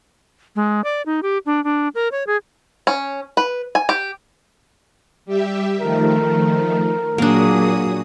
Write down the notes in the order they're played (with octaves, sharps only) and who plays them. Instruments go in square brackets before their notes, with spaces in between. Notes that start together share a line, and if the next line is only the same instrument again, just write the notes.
[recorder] G#3
D5
D#4
G4
D4
D4
A#4
C#5
G#4
[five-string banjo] C#4
B4
G#5
G4
[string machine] G3 G4 E5
[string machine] D#3 F3 A3 [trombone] A#4
[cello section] A#2 F#3 G#4 [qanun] A#3 D4 [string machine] F#4 D#6